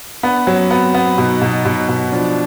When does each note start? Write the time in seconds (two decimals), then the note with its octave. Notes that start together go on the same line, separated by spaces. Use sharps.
0.23 B3 D4
0.47 F#3 C#4
0.70 B3 C4
0.94 B3 C4
1.18 B2 D#4
1.42 B2
1.65 B2
1.89 B2
2.12 F3 D4